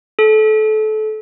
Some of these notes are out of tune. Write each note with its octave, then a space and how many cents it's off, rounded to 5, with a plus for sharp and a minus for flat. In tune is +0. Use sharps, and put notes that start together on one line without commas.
A4 -25